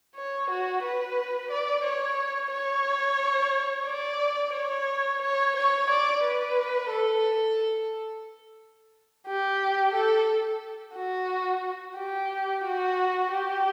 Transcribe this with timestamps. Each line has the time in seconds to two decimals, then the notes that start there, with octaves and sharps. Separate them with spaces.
0.16 C#5
0.50 F#4
0.83 B4
1.51 D5
1.84 C#5
2.52 C#5
3.86 D5
4.54 C#5
5.22 C#5
5.56 C#5
5.90 D5
6.24 B4
6.90 A4
9.27 G4
9.94 A4
10.96 F#4
11.97 G4
12.64 F#4
13.31 G4